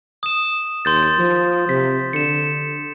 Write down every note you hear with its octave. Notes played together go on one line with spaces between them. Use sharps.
D#6 E7
D#2 C6 G6 A6
F3
C3 B6
D3 C#7 E7